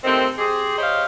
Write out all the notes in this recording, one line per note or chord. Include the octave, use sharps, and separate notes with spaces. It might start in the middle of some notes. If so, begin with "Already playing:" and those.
C3 D#3 A3 C4
C4 G4 G#4
G4 C5 C#5 D#5 F5